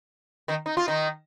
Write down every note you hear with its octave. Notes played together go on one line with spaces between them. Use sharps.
D#3 D#4
D#4
F4
D#3 D#4